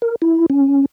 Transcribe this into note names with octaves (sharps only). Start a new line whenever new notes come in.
A#4
E4
C#4